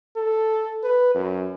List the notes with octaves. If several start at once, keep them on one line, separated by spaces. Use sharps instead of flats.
A4
B4
F#2